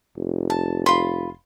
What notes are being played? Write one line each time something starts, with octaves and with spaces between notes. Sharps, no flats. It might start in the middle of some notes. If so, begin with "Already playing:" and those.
F1
A5
F4 B5 C6